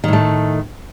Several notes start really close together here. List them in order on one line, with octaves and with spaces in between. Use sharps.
D#3 A2 A3